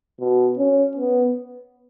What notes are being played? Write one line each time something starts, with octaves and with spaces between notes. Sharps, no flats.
B2
C#4
B3